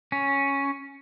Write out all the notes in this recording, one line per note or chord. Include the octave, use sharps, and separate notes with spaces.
C#4